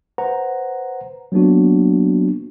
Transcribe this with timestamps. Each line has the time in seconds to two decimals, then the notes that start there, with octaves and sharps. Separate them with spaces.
0.18 B4 C5 F#5 A#5
1.32 F#3 A#3 B3 D4 F#4